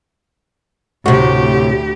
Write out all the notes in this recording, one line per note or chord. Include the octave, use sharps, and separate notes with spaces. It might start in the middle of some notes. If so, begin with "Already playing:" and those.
D2 A2 C3 F#4 G4